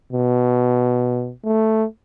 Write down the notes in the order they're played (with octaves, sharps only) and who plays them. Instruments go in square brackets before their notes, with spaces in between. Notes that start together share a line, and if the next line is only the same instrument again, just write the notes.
[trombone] B2
A3